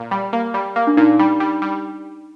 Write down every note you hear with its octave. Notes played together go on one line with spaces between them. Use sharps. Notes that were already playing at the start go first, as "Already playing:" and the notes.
Already playing: A#2
G3
A#3
G3
A#3
D4
A#2 D#4
G3
G3
G3